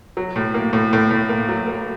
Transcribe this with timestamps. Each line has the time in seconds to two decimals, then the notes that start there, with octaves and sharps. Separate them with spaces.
0.17 F#3
0.36 A2
0.54 A#3
0.73 A2
0.93 A2
1.10 A2
1.29 A#3
1.49 F#3
1.67 A#3